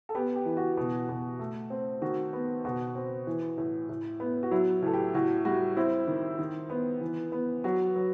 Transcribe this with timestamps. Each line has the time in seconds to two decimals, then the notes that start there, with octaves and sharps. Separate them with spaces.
0.09 A4
0.15 B3 G4
0.36 G4
0.46 E3
0.57 F#4
0.77 B2
1.09 B2
1.39 A3
1.70 C4
2.02 D#3 F#4
2.33 B3
2.65 B2 F#4
2.95 C4
3.27 E3
3.58 A2
3.89 A2
4.20 B3
4.43 F#4
4.51 F#3 E4
4.83 A2 A4
4.94 G4
5.14 A2 F#4
5.45 G3 F#4
5.77 C4 E4
6.07 D#3
6.39 D#3
6.70 B3
7.01 E3
7.32 B3
7.64 F#3 F#4
7.96 F#3